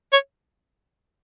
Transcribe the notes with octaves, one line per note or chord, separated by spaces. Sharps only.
C#5